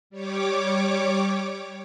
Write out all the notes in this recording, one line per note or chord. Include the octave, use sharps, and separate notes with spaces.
G3 C#5 D6